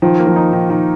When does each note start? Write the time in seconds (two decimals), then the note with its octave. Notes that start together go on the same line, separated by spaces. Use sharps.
0.02 D#3 F3
0.19 A#3
0.27 F3
0.36 D#4
0.53 D#3
0.70 D#3